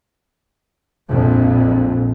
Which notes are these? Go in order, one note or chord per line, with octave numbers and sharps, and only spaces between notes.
A#1 F2